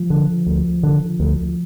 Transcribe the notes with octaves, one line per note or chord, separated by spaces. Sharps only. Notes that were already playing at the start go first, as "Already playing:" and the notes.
Already playing: F3
D3
D2
D3
D2